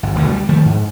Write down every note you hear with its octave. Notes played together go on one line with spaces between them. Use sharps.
G#1
D1 D2 B2 D3
G3
D#3 F3 A3
G#2